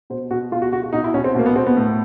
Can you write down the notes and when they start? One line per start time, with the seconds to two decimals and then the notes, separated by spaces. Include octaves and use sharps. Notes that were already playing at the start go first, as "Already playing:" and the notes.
0.10 B2 C5
0.31 B2 F#4
0.52 B2 F4
0.62 F#4
0.72 B2 F#4
0.83 F#4
0.93 B2 D#4
1.04 E4
1.14 B2 C#4
1.24 C4
1.35 B2 A#3
1.46 B3
1.56 B2 C4
1.66 B3
1.77 A2